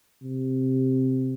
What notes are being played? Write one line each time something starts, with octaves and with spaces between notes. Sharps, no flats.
C3